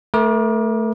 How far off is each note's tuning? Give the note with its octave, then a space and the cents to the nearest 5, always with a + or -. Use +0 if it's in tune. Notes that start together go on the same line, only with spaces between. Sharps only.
A3 +0 A#4 +40 D6 +20